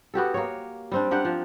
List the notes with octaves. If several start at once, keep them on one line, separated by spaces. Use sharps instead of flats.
B3 F#4 G4 A4
A#3 C#5
G3 C4 D4
A#3 D4 G4 F#5
F3